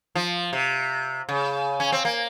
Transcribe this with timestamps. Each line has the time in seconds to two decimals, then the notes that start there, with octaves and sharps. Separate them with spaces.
0.15 F3
0.53 C3
1.29 C#3
1.80 C#4
1.92 C4
2.05 A#3